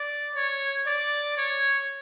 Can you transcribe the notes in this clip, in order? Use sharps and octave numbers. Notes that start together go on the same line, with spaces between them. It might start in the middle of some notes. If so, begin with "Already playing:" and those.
Already playing: D5
C#5
D5
C#5